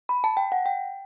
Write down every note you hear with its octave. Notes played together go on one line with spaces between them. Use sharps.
B5
A5
G5
F#5
G5